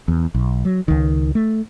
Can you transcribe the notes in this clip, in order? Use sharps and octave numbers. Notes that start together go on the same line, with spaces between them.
E2
B1
F#3
C#2 D#3
A3